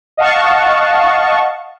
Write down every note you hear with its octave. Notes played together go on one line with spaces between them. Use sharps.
D#5 F5 F#5 A5 C#6